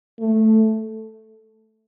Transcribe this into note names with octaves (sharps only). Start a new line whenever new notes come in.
A3